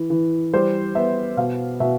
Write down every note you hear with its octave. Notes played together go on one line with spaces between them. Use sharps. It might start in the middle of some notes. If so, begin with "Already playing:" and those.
Already playing: E3
E3
G3 C5
B3 E5
B2 F5
B2 E5